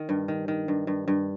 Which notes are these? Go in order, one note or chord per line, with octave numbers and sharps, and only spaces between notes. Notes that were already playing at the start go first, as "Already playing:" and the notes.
Already playing: D#3
G2
D#3
D#3
G2
G2
G2